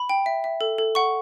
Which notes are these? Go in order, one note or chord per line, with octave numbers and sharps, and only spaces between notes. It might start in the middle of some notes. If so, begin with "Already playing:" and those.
Already playing: B5
G5
E5
E5
A4
A4
F#5 C#6